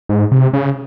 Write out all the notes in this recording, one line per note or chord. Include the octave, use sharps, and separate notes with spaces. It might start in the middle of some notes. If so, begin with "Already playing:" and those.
G#2
C3
C#3